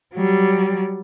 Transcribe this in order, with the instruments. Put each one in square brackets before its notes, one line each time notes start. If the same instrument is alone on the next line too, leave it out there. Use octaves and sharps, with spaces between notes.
[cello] F#3 G3